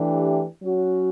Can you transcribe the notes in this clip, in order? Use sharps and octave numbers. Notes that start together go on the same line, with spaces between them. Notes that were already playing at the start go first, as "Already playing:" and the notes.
Already playing: E3 A3 D4 G4
F#3 C#4 F#4